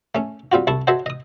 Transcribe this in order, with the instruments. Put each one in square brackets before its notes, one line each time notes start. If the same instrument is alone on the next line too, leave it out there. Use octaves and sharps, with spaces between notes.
[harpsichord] A3 C#4
G3 C4 F4 F#4
C2 E4 A5 C#6
F#4 A4 C5 C#5 D#5 E5
D#5 D#6